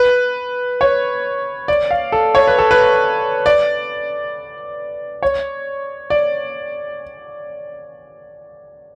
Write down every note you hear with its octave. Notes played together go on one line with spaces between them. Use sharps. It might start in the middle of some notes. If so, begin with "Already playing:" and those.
Already playing: B4
C#5
D5
F5
A4
C#5
B4
A4
B4
D5
C#5
D5